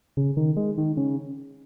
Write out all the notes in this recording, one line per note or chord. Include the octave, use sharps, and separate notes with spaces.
C#3
D#3
G#3
D#3
C#3